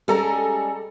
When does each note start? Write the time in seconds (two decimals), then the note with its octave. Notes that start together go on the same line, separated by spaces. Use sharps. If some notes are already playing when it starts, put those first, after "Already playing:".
0.08 G3 G#3 C#4 G#4 A4 A#5